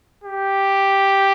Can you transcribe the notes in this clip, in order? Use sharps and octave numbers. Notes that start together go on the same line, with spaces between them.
G4